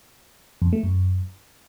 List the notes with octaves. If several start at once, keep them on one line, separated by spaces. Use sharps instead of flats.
F2
A3
F#2